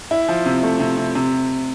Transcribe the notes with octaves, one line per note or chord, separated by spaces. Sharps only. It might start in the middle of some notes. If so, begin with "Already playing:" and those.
E4
F3
C3
A3
C3
C3
C3